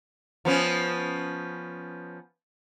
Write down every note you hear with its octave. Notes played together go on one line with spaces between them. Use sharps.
F3 B3 C#4